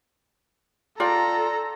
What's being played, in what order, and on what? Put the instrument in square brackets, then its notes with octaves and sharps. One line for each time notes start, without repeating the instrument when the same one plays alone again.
[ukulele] F4 D5 G5 [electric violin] A4 A#5